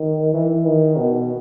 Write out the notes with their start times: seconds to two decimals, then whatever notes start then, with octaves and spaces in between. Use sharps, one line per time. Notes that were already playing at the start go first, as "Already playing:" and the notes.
Already playing: D#3
0.34 E3
0.65 D#3
0.97 B2